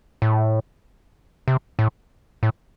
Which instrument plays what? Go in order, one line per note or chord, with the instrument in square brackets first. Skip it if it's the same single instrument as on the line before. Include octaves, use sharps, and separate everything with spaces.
[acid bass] A2
C3
A2
A2